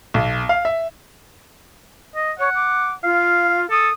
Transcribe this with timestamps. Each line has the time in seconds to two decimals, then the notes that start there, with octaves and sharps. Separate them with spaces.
0.14 B1
0.49 F5
0.65 E5
2.16 D#5
2.39 C#5 F#5
2.55 D6
3.04 F4 F5
3.70 A4 D#6